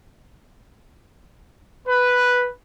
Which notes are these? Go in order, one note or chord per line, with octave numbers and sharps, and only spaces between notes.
B4